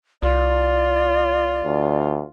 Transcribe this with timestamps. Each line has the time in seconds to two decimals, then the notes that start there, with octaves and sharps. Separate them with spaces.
0.23 C2 F4 D5
1.65 D2